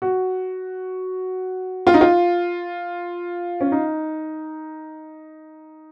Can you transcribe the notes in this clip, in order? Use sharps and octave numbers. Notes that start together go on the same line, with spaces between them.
F#4
F4
D#4
F4
C#4
D#4